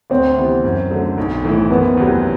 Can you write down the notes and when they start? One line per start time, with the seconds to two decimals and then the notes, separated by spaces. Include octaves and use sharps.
0.10 D2 C4
0.37 C3 E3 B3 E4
0.64 F#2
0.90 D3 F#3 A3
1.18 B1
1.44 A2 E3 A3 E4
1.70 F#1 B3
1.97 E2 C3 F#3 A3